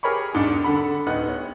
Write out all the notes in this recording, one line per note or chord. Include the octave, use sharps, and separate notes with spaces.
G4 G#4 A#4 C#5 B5 C#6
E1 G#2 D4 C#7
D3 A4 F#5 B5
D1 B3 D#4 F#5 F#6
C#5